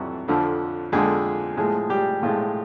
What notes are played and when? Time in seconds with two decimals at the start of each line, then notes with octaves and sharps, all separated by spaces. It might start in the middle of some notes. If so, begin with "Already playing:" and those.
Already playing: F2 C3 E3 F#3 G3 F#4
0.28 F2 D3 F3
0.92 F2 D3 F3 G#3 G#4
1.57 A2 F3 G#3 G#4
1.89 G3 G4
2.22 A2 F3 G#3 F4